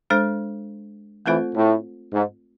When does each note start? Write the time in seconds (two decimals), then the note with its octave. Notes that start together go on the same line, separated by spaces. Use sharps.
0.10 G#3 D4 A4 C5
1.26 E3 A3 C4 F4 A4 C5
1.55 A2
2.13 G#2